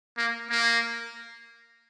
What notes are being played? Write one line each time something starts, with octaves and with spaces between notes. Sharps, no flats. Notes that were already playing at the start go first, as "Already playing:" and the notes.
A#3
A#3